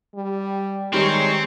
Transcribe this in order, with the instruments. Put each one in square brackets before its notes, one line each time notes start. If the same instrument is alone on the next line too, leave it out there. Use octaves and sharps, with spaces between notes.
[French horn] G3
[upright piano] D#3 G3 [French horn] G#3 [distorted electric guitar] C4 [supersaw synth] C#5 A#5 C#6